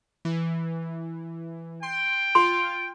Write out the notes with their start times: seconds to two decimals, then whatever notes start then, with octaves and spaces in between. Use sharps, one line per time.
0.25 E3
1.83 G5 C6
2.35 F4 C6